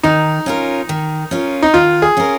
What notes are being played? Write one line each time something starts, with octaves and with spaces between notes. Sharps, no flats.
D#3 D#4
C#4 F4 A#4
D#3
C#4 F4 A#4
D#4
D#3 F4
G#4
C#4 F4 A#4